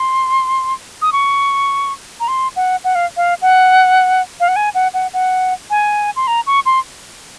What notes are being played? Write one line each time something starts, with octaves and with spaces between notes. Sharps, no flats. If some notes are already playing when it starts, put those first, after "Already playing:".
Already playing: C6
D#6
C#6
A#5
C6
F#5
F#5
F5
F5
F#5
F5
F#5
G#5
F#5
F#5
F#5
G#5
C6
A#5
C#6
C6